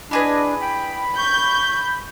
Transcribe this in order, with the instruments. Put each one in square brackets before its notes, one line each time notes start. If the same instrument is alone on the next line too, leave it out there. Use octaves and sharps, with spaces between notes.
[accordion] D4 [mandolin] E4 G#4 B4 [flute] D#5
[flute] G5 [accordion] B5
[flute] C#6 [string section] G6